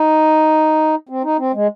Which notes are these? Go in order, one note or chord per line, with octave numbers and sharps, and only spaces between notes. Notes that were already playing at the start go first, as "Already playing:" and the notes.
Already playing: D#4
C4
D#4
C4
G#3